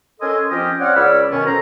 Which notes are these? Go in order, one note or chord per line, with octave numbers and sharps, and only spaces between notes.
C#4 A4 A#4 D#5 G#5 C6
F3 C4 C#4 G4 D#5 G5
C4 C#5 D5 F5 F#5
C#2 C#5 D5 B5 E6 F6
F#2 B2 D#3 B3 C#4
A4 A#4 C5 A#5